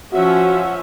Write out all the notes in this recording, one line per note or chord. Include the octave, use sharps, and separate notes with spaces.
F3 C#4 F#4 E5 F#5